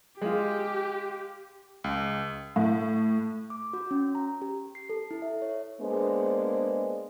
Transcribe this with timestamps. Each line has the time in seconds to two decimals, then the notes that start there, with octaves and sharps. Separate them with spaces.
0.21 G#3 F4 G4
1.84 C#2
2.56 A2
3.50 D6
3.73 F#4
3.91 C#4
4.15 A#5
4.42 G4
4.75 C7
4.90 A4
5.11 E4
5.22 E5
5.42 C#5
5.80 G#3 A#3 B3 D4 G#4 C5